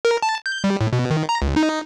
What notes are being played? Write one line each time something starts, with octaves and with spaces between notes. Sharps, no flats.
A#4
A5
G6
G3
A2
B2
D#3
A#5
C#2
D#4